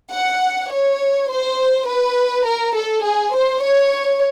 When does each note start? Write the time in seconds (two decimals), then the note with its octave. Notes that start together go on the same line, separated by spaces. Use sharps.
0.11 F#5
0.70 C#5
1.28 C5
1.87 B4
2.45 A#4
2.75 A4
3.04 G#4
3.33 C5
3.62 C#5